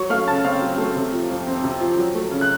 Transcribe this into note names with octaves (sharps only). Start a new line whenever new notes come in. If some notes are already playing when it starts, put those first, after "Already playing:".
Already playing: F#3 C#5 C#6
A3 F5 F6
C#3 A5 A6
C4 F5 F6
F#3
A3
C3
F3
F2
C4
C3
F3
F#3
A3
C#3
F#6